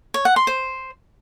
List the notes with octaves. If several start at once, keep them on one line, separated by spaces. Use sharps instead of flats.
C#5
F#5
C6
C5